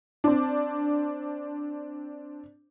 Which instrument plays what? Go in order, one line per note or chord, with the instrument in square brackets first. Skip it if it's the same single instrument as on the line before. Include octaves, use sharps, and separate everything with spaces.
[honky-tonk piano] C4 D4